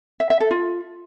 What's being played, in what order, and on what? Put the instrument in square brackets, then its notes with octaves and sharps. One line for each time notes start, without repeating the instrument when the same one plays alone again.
[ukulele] E5
E5
A4
F4